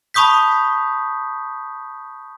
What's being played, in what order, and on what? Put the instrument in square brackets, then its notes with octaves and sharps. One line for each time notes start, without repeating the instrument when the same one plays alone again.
[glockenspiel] A5 B5 C#6 D#6 G6 B6